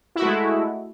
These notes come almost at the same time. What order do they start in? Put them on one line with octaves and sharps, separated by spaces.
E4 F#4 A3 G#3